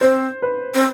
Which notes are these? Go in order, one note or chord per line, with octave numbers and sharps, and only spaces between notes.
C4 C5
B4
C4